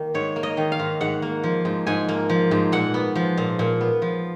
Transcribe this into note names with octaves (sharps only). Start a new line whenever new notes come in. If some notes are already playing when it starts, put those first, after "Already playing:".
Already playing: D#3 A#3
G#2 C#5
A#3
D#5
D#3
F5
G#2
G#2 F#5
A#3
F3
G#2
G#2 G#5
A#3
F3
G#2
A#2 F#5
B3
F3
A#2
A#2
B3
F3